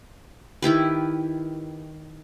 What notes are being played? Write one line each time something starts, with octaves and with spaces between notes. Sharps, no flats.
D#3 E4 G4 B4